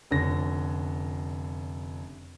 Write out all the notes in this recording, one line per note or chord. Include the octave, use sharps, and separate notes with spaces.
F1 D3 C#4 A#6